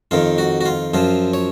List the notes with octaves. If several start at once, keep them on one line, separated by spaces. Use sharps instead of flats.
F2 D#3 F4
F#4
F#4
F4
F#2 F3 F4
C#5